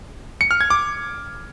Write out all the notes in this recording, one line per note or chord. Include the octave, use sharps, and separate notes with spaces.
C#7
F6
G#6
D6